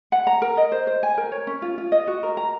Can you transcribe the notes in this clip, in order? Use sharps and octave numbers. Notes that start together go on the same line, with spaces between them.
F#5
A#5
A#4
D#5
C5
C5
G#5
A#4
C#5
C#4
F4
F4
D#5
F#4
A#4
A#5